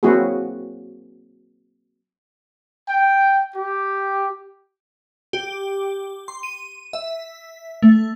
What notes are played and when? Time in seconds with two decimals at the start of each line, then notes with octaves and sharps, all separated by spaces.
0.03 F#3 A#3 C4 E4 F#4 G#4
2.87 G5
3.56 G4
5.33 G4
6.28 C6
6.43 D#7
6.93 E5
7.82 A3